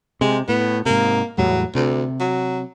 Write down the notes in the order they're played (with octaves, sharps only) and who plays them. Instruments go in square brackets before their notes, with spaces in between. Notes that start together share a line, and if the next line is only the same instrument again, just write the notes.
[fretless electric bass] C3 [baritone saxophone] G#3
[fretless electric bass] A2 [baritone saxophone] B3
[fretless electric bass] G#2 C3 [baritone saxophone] A#3
[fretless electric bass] E2 A2 G3 [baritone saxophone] F#3
[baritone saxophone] D2 [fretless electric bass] C3
[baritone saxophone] F#3